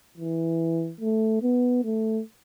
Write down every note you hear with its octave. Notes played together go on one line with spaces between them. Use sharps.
E3
A3
B3
A3